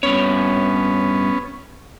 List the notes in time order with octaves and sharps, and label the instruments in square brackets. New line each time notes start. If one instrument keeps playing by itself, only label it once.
[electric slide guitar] G2 C#5 [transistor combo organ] B3 C#4